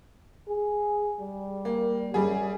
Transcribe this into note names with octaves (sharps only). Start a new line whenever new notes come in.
G#4
G3
A#3
F#2 G3 G#4